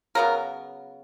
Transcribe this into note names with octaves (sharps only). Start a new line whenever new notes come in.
C#3 F#3 B3 A#4